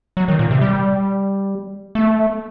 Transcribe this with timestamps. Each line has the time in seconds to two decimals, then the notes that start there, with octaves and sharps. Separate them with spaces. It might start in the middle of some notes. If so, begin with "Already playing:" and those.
0.17 F#3
0.28 D#3
0.39 A#2
0.51 C3
0.61 G3
1.95 A3